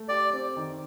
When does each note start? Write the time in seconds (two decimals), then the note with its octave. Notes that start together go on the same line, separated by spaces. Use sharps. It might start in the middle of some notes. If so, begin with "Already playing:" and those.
Already playing: A3
0.09 G4 D5
0.33 C4
0.56 D#3